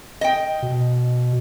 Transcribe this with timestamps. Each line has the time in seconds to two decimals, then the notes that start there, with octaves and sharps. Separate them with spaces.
0.21 D#5 G5
0.62 B2